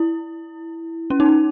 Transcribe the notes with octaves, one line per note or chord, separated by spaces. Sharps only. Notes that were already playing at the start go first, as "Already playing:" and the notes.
Already playing: E4
C#4
D#4